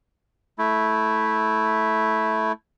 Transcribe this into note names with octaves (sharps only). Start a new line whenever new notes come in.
A3 E4